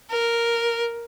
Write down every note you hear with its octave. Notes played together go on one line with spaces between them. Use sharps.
A#4